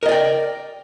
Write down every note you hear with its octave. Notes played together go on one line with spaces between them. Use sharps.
A#4 D5 D#5 G5